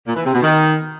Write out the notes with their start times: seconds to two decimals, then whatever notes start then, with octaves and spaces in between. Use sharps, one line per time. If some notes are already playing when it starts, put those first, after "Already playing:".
0.07 A#2
0.16 E3
0.25 C3
0.33 B2
0.42 D#3